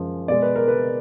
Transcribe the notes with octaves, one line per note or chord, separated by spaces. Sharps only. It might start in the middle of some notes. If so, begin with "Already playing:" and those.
Already playing: F#2 F3 G#3
B2 G#3 D5
B4
A#4
B4